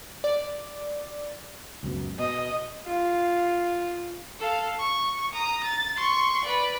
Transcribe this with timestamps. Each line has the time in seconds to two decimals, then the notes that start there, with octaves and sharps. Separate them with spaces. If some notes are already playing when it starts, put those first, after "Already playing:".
0.24 D5
1.83 C#2 F#2 B2
2.19 B2 D#5
2.85 F4
4.39 A4 F5
4.78 C#6
5.33 A#5 D#6
5.64 A6
5.96 C6 C#6
6.44 B4 D5